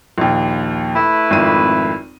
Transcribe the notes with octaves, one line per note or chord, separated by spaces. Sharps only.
A#1 D#2
A3 E4 B4
G#1 F2 D#7